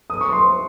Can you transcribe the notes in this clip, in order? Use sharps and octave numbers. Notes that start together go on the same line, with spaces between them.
D#6
C#6
C6